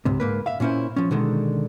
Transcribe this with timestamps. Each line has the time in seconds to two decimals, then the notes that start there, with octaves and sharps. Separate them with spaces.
0.05 C#2 G#2 C3
0.20 G#2 A#3 B4
0.46 E5 F5
0.60 A#2 A#3 C#4 E4 C5
0.96 F3 C#4
1.11 B2 D3 D#3 G#3